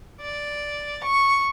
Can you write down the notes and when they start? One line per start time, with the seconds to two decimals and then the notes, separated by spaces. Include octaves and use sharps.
0.21 D5
1.03 C#6